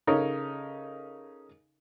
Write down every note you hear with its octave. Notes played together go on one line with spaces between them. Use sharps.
C#3 D#4 A4 A#4 C#5